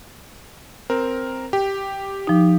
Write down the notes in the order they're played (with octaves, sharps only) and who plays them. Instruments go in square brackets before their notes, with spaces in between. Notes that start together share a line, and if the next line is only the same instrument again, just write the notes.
[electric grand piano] C4 A#4
G4
[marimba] F3 D#4